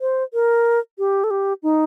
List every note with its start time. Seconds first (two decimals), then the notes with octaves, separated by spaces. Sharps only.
0.01 C5
0.34 A#4
0.99 G4
1.24 A4
1.31 G4
1.63 D#4